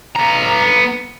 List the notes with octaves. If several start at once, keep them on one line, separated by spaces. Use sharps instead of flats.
B3 A#5